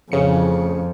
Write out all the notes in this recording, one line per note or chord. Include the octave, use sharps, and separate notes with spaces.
A1 F2 C#3 C#7